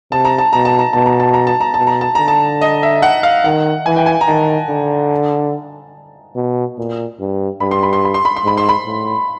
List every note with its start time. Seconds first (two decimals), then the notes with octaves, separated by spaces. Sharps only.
0.12 C3 A5
0.25 A#5
0.38 A5
0.53 B2 A#5
0.65 A5
0.79 A#5
0.93 B2 A5
1.06 A#5
1.20 A5
1.34 A#5
1.47 A5
1.60 A#5
1.74 B2 A5
1.87 A#5
2.01 A5
2.15 D3 A#5
2.28 A5
2.61 D#5
2.83 E5
3.02 F#5
3.23 F5
3.44 D#3 F#5
3.86 E3 G#5
3.96 G5
4.06 G#5
4.21 A#5
4.28 D#3 A5
4.69 D3
6.36 B2
6.78 A#2
7.20 G2
7.60 G2 B5
7.71 C6
7.83 B5
7.93 C6
8.05 B5
8.14 C6
8.25 B5
8.36 C6
8.44 G#2 B5
8.58 C6
8.69 B5
8.86 A2